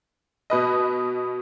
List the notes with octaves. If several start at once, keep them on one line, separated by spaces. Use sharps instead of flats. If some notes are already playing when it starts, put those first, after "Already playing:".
B2 B4 D#5